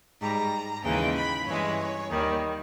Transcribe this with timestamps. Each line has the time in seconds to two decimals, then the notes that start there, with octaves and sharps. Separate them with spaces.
0.21 G#2 G3 A#5
0.83 D#2 C#3 E3 G#3 G5
1.15 B5
1.46 G2 E3 G#3 C#5
2.10 D#2 D#3 G3